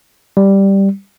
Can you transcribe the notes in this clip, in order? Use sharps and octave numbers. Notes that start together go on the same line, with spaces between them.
G3